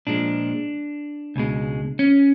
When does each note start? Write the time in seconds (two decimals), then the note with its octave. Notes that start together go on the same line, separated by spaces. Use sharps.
0.07 A#2 F3 G#3 D4
1.36 C#2 B2 G#3
1.99 C#4